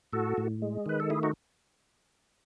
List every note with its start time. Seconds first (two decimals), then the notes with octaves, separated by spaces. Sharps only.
0.13 A2 F#4 A4
0.37 A2
0.62 G#3
0.86 D#3 B4
1.00 A4
1.10 A3 E4 G#4
1.23 D#4 F#4